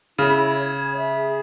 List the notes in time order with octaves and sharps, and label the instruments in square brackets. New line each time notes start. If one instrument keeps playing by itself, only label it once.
[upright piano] C#3 [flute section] E4
[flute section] C#5
C#5
G#4
E5
G#4